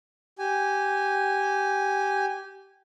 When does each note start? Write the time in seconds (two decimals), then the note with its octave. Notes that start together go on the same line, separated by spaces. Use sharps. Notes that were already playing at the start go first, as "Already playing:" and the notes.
0.39 G4 G#5